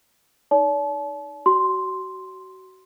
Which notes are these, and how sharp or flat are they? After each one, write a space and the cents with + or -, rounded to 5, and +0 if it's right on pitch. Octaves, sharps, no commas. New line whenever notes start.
D#4 +0 D5 -45 A5 -35
F#4 +30 C6 +0